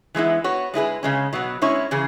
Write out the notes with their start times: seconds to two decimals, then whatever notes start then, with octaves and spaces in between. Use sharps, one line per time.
0.15 E3 G#3 B3 E4
0.44 B3 F#4 C#5
0.74 G#3 E4 G#4 B4
1.03 C#3 G#3 C#4
1.33 B2 F#3 B3
1.62 G#3 C#4 E4 C#5
1.91 C#3 E3 C#4 G#4